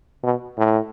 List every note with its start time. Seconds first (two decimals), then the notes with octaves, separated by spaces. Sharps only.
0.23 B2
0.58 A2